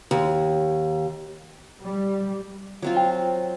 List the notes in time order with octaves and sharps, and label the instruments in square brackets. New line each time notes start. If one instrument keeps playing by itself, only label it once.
[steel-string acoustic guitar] D#2
[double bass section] G3
[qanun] F#3 C4 F4
[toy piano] G5